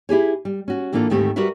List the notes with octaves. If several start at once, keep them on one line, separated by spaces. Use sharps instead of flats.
E4 G4 G#4 C#5
G3
C#4 F#4
A2 E3 A#3 D4 F4 A4
D2 G#2 D#3 A3 C4 G4
G3 F#4 G4 A#4 B4 E5